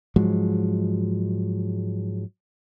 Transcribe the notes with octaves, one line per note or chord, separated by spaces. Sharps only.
G#2 F3 F#3 G#3